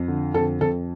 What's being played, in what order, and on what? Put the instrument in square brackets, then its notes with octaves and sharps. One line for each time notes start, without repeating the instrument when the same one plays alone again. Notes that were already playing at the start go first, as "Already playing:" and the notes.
Already playing: [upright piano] F2
D3
F2 A4
F2 A4